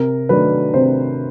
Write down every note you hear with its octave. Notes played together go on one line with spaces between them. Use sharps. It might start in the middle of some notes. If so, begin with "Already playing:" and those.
Already playing: C3 A#4
D#3 F#3 A3 D4 B4
C3 C5